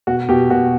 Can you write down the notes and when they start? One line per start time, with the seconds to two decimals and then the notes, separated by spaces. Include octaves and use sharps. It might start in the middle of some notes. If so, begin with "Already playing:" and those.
0.07 B2 F#4
0.29 B2 G4
0.50 B2 F#4